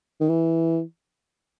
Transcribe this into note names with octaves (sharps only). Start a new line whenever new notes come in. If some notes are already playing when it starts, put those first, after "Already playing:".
D#3
E3